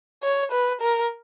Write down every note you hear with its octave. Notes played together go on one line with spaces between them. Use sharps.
C#5
B4
A#4